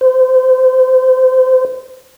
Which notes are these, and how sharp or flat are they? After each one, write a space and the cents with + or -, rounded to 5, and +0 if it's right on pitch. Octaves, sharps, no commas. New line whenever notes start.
C5 -25